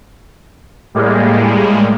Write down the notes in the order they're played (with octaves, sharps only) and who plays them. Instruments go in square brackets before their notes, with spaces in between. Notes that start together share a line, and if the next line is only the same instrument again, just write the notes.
[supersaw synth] A2 G3 G#3 A#3